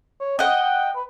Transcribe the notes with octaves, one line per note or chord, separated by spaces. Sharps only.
C#5
D#5 F#5 G5
G5
B4